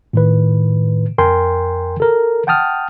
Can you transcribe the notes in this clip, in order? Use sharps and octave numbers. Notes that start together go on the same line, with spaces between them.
A2 D#3 B4
F2 A#4 G5 G#5 C6
A4 A#4
F#5 G5 A5 D#6 F6